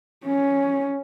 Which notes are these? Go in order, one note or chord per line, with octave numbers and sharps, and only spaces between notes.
C#4